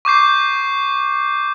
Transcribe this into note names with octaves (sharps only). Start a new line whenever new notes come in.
C#6 D6 G6 C7